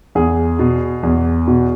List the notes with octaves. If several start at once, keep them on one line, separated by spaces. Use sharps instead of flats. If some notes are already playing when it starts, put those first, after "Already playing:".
E2 G#4
B2
E2
B2